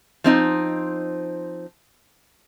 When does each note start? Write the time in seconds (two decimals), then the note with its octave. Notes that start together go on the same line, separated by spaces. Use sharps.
0.24 F3 C4 D#4